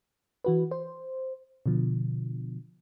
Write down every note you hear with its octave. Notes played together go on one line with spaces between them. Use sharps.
E3 F#4 B4
C5
B2 D3 F3